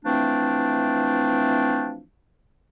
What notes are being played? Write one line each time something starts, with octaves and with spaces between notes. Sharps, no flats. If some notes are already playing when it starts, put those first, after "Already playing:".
E3 F3 A3 C4 D4